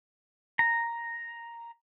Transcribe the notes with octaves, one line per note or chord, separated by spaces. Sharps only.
A#5